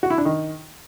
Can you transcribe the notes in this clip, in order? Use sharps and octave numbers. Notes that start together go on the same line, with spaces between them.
F#4
E4
D4
D#3